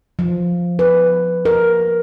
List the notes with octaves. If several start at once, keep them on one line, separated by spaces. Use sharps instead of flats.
F3
B4
A#4